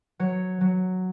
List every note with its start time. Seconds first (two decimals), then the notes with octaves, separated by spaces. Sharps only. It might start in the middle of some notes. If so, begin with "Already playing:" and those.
0.19 F#3 C#5
0.61 F#3